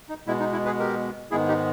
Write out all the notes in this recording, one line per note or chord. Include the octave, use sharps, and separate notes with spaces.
D#4
B2 G#3 B3 E4
D#4
E4
G#4 B4
G4 A#4
G#2 D#3 G#3 B3 E4 G#4
D#4 G4